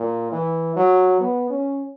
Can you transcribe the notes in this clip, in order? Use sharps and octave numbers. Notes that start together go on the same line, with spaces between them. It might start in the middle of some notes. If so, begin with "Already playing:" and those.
Already playing: A#2
E3
F#3
B3
C#4